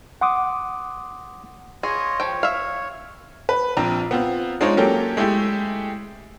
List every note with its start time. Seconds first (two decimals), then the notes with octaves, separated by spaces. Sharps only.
0.21 F#5 C6 D6 D#6
1.83 F4 G#4 C#5 D#5
2.20 F3 C#5 G5
2.43 E5 F5
3.49 B4
3.77 A#1 F3 C4 D4 A#5
4.11 B3 C4 F4
4.61 G#3 D4 D#4 F4 C5 C#5
4.77 F#3 A#3 C#4 G4 A4
5.17 G#3 A3 E4 G4